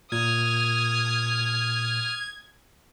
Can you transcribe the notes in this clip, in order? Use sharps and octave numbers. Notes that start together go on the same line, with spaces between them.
A#2 D#6 F6 G#6